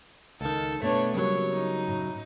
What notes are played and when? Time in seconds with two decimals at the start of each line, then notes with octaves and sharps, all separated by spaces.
0.41 C#2 D#3 A4
0.82 B2 A3 B3 D4 C#5
1.14 C#3 F#3 G3 A#3 C#5
1.51 D#4
1.88 A2